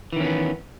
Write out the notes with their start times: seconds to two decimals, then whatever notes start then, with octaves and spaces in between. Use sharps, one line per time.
0.13 E3
0.16 D#3
0.20 C#4
0.24 B3